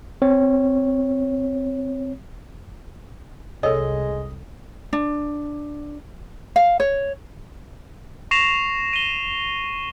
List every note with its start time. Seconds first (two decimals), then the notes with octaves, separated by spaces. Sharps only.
0.22 C4 C#5
3.63 C2 G#3 A4 C#5 D#5
4.93 D4
6.56 F5
6.80 C#5
8.31 C#6 A#6 C7 E7 F7
8.93 D#7 G7